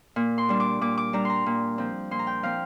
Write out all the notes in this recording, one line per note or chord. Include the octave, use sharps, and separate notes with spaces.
A#2
C6
G3 D4
D6
A#2 D6
D6
G3 D4 A#5
A#5 C6
A#2
F3 C4
A#2 C6
A#5
G5
F3 C4 F5